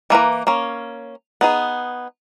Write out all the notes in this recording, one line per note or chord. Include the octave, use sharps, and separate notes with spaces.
E3 A#3 B4 A#5
A#3 C#4
B3 D#4 G#4